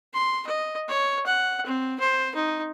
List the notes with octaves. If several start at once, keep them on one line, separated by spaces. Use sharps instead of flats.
C6
D#5
C#5
F#5
C4
C5
D#4